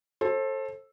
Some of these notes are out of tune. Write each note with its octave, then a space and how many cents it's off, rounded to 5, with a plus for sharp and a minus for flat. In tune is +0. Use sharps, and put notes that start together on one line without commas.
A4 +0 C5 +35